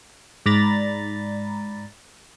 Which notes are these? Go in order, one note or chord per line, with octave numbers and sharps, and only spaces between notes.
G#2 D5 A#5 B5 A6